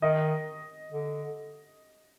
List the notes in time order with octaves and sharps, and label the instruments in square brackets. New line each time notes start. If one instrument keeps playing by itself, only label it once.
[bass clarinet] D#3 [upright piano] D#5
[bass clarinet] D3